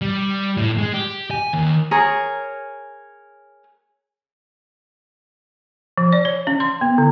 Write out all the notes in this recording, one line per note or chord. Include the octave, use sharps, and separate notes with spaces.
G3
A2
G#3
G4
G#5
D#2
G#4 A#4 C#5 A#5
F3
D5
C#5
C#4
C6
B3
D3